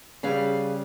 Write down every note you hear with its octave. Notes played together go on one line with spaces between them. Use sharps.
C#3 G3 G#4 B4 F5